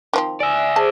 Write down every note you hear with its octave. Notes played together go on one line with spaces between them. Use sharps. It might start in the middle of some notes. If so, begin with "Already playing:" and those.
D#3 F3 C4
D5 E5 G#5
G#4 C5 A5